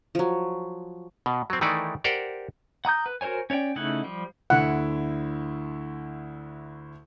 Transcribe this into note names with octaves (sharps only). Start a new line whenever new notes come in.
F3 F#3
B2
F#3 C4
D#3 E3 A3 D#4 E4 D5
G4 A#4 C5 D5 F#5
F#5 A#5 D#6 G6
B4
F#4 A#4 C5 C#5 G#5
C#4 C#5 D5 G5
C#3 A3 D#4 E4 F#5
F3 G3
D2 D3 E4 F#5